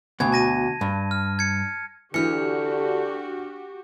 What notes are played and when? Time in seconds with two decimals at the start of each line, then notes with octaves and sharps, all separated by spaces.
0.20 D2 B2 G#6
0.32 A5 A#6 D#7
0.81 G2
1.11 F6
1.39 G#6 C#7
2.14 D3 E3 D4 F#4 G4 F6 C#7